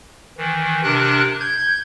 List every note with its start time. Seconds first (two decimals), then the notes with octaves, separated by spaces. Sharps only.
0.38 D#3 E3
0.83 C3 D4 A#4 F#6
1.40 G6 G#6